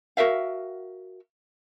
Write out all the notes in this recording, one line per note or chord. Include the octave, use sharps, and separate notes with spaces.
F#4 A#4 E5 F5